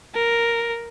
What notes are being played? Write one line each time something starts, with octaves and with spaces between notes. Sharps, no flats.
A#4